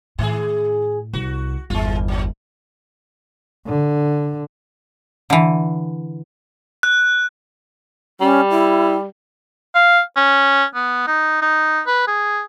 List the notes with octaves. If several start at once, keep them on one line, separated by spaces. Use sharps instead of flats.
A2 D#3 G#4
C2 F#4
G1 E2 G#3 F4
A#2 F#3
D3
D3 E3
F#6
G3 C#4
E4
F5
C#4
B3
D#4
D#4
B4
G#4